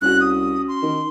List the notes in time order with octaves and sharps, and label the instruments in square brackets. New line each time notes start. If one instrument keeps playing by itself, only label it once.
[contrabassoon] C2 [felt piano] C#4 F#4 [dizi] F#6
[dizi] D#6
C6
[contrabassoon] D#3